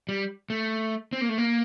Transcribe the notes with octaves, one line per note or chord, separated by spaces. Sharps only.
G3
A3
C4
A#3
A3
A#3